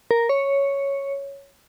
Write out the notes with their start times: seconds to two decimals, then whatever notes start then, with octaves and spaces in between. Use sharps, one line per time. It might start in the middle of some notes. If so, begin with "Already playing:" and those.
0.11 A#4
0.29 C#5